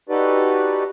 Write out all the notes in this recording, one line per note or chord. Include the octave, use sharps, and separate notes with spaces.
D#4 F#4 G4 A4 B4 D5